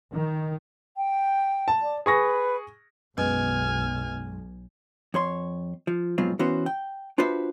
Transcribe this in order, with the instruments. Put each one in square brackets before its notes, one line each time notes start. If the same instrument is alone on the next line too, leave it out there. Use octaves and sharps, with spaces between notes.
[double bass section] D#3
[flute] G5
[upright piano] A5
[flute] D5
[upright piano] G#4 C#6 A#6 [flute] B4
[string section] B1 [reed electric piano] F#2 G#3 [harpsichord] B2 [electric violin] G#5 F6
[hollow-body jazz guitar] F2 C#5 C6
F3
G#2 B2 F3 F#3 C4 F4
E3 B3 C#4 F#4 C5
G5
D4 F4 F#4 B4 C5 E5